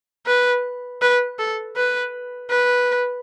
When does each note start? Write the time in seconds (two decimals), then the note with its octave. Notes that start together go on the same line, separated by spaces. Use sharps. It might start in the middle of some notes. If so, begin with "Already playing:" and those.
0.27 B4
1.02 B4
1.39 A4
1.76 B4
2.50 B4